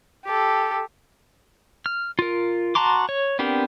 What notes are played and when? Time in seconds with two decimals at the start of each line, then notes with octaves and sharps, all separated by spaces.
0.25 G4 A4
1.86 F6
2.19 F4 A#4
2.75 F#4 A5 A#5 C6 D6
3.09 C#5
3.39 B3 C4 D4 G4 A#4